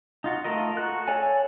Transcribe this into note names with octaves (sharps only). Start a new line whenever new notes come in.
D#4 F4 F#4
A3 F4 A#4 D#5
F#4 A4 F#6
A4 C#5 D5 F5 G#5